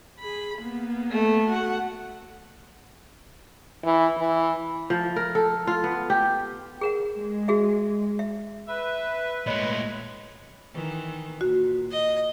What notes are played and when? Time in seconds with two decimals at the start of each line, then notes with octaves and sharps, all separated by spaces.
0.20 G#4 B5
0.58 A#3 B3
1.11 A3
1.47 F#4 F#5
3.84 E3
4.18 E3
4.90 F3
5.16 A#4
5.35 A4
5.67 F4
5.84 B3
6.10 G4
6.81 G#4 A#4 F#5
7.15 G#3
7.48 F#4 G#4 E5
8.19 E5
8.67 B4 E5
9.47 A#2 G#3 A3 C#5 D#5 B5
10.73 D#3 E3
11.41 A#2 F#4
11.92 D#5